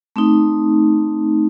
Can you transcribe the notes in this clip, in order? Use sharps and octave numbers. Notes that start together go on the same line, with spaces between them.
A3 C4 D#4